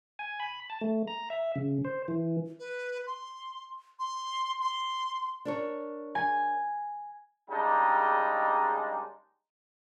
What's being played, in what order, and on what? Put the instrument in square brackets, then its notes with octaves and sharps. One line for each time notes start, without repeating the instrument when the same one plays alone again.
[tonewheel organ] G#5
B5
A5
A3
A#5
E5
C#3
C5
E3
[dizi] B4
C6
C6
C6
[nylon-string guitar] D4 A#4 C#5
[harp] G#5
[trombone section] C#3 G3 G#3 A#3 D4 D#4